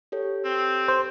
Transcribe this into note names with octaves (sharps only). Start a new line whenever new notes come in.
G4 A4 C#5
C4
C5